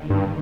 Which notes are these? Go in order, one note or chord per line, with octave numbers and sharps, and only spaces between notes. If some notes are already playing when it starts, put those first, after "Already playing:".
Already playing: D#2 D3 D#3
G2